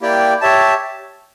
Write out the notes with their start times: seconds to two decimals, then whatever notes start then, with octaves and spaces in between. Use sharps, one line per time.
0.01 A#3 E4 G4 D5 G5
0.41 G4 C#5 E5 A5